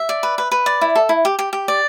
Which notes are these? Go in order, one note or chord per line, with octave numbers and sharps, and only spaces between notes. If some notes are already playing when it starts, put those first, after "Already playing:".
Already playing: E5
D5
B4
B4
B4
D5
E4
A4
E4
G4
G4
G4
D5